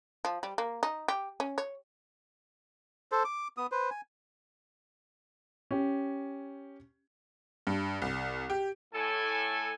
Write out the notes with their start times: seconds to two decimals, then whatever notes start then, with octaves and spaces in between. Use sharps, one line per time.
0.25 F3
0.43 G3
0.58 A#3
0.83 D#4
1.08 G4
1.40 C#4
1.58 C#5
3.12 A4 C5
3.24 D6
3.57 B3 D#6
3.72 B4 C5
3.91 G#5
5.71 C#4 G4
7.67 G2
8.02 C2
8.50 G4
8.94 A2 A4 G#5